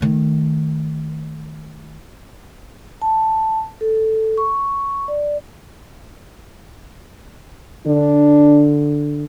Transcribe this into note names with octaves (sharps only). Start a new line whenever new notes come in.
D#3 A3
A5
A4
C#6
D5
D3 D4